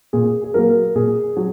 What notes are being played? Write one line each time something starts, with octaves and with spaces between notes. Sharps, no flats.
A#2 G#4
G#4
F#3 A#3 A#4
A#2 G#4
F#3